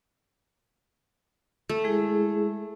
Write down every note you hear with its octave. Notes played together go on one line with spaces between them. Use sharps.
A3
G#3 E4 G#4